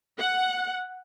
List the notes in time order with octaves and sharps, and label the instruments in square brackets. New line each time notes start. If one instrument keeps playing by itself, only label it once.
[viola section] F#5